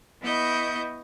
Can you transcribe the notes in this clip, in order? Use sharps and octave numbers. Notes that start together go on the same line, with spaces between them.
B3 E4 D#5 C#6 G6